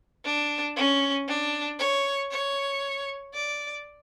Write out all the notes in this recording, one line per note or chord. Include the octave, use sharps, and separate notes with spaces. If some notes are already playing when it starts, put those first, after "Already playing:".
D4
C#4
D4
C#5
C#5
D5